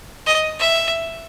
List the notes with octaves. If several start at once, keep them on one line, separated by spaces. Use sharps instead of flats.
D#5
E5